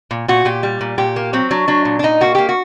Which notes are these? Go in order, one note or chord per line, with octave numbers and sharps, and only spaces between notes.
A#2
A#2 F#4
A#2 G4
G3
A#2
A#2 G4
A#3
F#3 C4
F#3 D4
F#3 D4
A#2
D4
A#2 D#4
A#3 F#4
A#3 G4
F#4